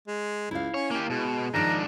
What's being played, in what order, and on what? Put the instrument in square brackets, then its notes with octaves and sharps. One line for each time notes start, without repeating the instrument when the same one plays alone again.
[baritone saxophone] G#3
[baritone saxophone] C#2 [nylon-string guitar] E4 F5
[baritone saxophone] C#4 [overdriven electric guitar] C#5
[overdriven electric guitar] A#3 G4
[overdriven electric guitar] B2 [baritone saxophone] G#3
[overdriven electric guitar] G#2 D4 [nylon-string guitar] D#3 F3 D#4 [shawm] A#5